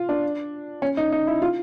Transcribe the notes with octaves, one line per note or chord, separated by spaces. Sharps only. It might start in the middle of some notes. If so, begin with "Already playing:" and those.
Already playing: F4
D4
C#4
D#4
D#4
E4
F4